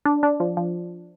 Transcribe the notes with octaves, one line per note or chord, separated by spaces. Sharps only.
D4
D4
F3
F3